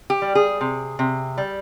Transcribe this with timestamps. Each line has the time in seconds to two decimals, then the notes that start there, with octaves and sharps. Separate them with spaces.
0.10 G4
0.22 G3
0.35 G#4
0.61 C3
0.99 C3
1.38 G3